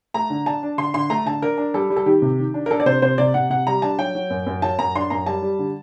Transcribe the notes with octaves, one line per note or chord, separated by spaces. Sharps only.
A3 A#5
D3
D4 A5
D4
D3 C6
D3 C6
A3 A#5
D3 A5
D4 A#4
D4
G3 A4
G3
A4
D#3 G4
C3
D#3
D4
A#4
D4 A4
D5
C3 C5
C3 C5
C3 D5
C3 F#5
C3 F#5
G3 A#5
D4 A5
F#3 G5
F#3
F#2
F#2
F#3 A5
F#2 A#5
D4 C6
F#2 A#5
G3 A5
G3
D3